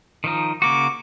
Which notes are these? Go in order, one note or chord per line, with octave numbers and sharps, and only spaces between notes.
D#3 F3 D#4
C#3 A#3 F#4 D6